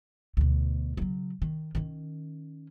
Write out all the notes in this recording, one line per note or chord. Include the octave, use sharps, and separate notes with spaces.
D2 B2
C#3 F#3
D#3
D#3 C#4